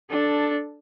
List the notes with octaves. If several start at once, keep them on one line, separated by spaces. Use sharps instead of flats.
D4 A4